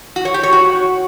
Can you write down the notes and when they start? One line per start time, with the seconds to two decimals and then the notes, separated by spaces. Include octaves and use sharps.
0.16 F#4
0.25 C#5
0.34 G4
0.43 C#5
0.53 F#4